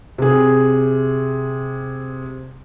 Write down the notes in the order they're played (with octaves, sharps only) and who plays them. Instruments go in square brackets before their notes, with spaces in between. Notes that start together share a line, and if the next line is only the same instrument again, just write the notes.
[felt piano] C3 G#4